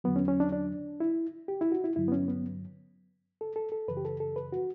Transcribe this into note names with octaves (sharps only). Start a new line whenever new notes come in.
E2 D3 F#3 B3
C#4
C#4
D4
D4
E4
G4
E4
F#4
E4
G2 D3 F#3 E4
B3
C#4
B3
A4
A4
A4
F#2 C#3 E3 B4
G4
A4
A4
B4
F#4